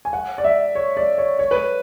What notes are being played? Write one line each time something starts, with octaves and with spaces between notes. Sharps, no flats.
G#5
F#5
D5
E5
C#5
D5
C#5
C#5
B4